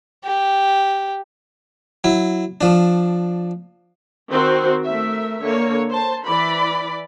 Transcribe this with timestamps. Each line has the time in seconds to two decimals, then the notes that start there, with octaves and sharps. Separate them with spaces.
0.25 G4
2.04 F#3 E4
2.61 F3 D4
4.30 D#3 C4 F#4 C5
4.84 A3 A#4 E5
5.41 D3 A#3 C#5
5.90 C5 A5
6.25 E3 D5 B5